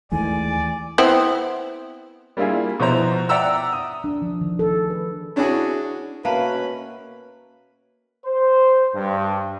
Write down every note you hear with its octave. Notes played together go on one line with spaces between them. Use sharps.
D#2 D#3 E3 G#3 A3 D5 G#5
B3 C4 E4
G3 A#3 D4 E4 F4 G#4
B2 F3 B3 E4 C5 A#5
D5 E5 F#5 G5 A#5 E6
D#6
D4
F3
D#3
A4
G#4
B4
C#4 D4 E4 F#4 G#4 G#5
B2 A#3 C#4 F#4 B4 E5 A5 A#5
C5
G2